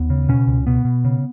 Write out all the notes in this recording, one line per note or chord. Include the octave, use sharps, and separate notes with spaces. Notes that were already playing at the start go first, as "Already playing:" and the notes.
Already playing: D#2 B3
C#3
B2 C#4
C#2
B2 B3
B2
C#3